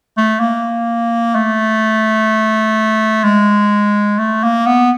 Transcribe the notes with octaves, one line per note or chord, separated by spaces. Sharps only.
A3
A#3
A3
G#3
A3
A#3
B3